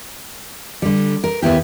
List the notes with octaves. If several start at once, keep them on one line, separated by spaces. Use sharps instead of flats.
D3 G3
A#4
D#2 B3 E4 G4